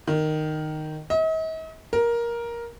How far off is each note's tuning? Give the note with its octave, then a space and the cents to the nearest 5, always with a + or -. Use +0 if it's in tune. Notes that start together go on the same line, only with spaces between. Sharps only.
D#3 -10
D#5 +45
A#4 +10